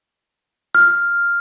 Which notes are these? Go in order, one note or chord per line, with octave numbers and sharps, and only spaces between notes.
F6